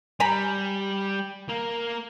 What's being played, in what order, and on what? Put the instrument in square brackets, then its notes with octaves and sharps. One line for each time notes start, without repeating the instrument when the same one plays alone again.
[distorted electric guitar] G3 [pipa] G#5 A#5 B5
[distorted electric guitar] A#3 A#4